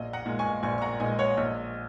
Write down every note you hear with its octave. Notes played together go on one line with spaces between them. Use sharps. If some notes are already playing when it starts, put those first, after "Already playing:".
Already playing: A#1 D#5
F#5 A#5
A#2 G#3
G#5 C#6
A#1 G#5 C#6
C#6
F#5 A#5
A#2 G#3 D#5 G#5
C#5 F#5
A#1 D#5